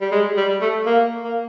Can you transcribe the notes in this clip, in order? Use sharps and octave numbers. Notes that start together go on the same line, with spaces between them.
G3
G#3
G3
A3
A#3
A#3